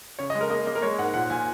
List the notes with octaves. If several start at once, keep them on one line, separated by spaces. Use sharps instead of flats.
C#3 C#5
D#5
G#3
A#4
A#3 D#5
A#3 D#5
A#4
G#3 C#5
G#2 F#5
A#2 F#5
A#2 G#5